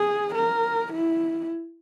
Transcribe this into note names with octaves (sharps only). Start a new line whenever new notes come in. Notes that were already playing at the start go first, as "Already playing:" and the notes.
Already playing: G#4
A#4
E4